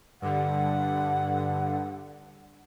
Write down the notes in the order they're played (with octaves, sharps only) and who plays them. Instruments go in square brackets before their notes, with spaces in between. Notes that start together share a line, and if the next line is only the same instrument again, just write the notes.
[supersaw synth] G2 D3 [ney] F#5